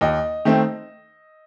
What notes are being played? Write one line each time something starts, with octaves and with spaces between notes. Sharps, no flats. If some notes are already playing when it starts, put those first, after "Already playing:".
D#2 D#5
D#3 A3 C4